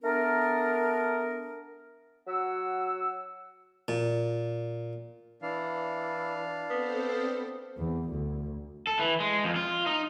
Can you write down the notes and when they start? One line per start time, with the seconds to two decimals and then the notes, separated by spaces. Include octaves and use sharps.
0.03 A3 B3 D4 A#4
2.27 F#3 F#5 E6
3.88 A#2
5.42 E3 D4 F5
6.70 B3 C4 A4 C5
7.78 E2
8.11 D2
8.87 A4
8.99 E3
9.20 G#3
9.44 F2
9.56 F4
9.86 D#4